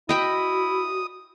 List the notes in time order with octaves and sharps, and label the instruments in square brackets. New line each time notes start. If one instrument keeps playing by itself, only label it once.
[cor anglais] E4 [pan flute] F#4 [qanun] D#5 G5 B5 [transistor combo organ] D#6